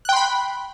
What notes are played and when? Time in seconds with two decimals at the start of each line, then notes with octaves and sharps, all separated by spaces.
0.05 F#6
0.09 G5
0.13 C6
0.16 B5